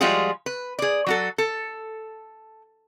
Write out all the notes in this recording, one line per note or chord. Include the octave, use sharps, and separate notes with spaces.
F3 G3 G#3 F4 F#4 G#4
B4
G#4 D5
F#3 F#4 A4
A4